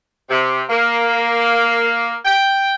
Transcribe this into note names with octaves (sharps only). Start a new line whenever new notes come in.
C3
A#3
G5